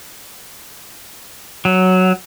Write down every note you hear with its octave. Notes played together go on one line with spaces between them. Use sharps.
F#3